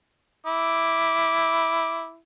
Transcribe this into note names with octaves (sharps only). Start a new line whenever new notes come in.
E4 D6